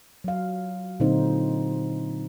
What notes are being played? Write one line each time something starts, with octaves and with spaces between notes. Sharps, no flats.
F#3 F5
A#2 D3 F#3 C4 D#4 C5